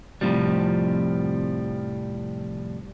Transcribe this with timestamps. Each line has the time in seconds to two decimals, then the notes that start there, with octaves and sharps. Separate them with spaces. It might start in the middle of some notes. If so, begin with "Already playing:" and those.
0.21 F2 A2 C3 F3 G3